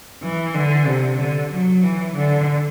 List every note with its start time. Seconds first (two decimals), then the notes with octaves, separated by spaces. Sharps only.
0.23 E3
0.55 D3
0.86 C3
1.19 D3
1.51 F#3
1.83 E3
2.15 D3